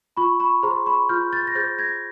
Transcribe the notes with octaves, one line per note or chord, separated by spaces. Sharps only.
F4 B5 C#6
B5 C#6
G#4 C5 A#5 C6
B5 C#6
F4 F6 G6
G6 A6
A#6
G#4 C5 G6 A6
G#6 A#6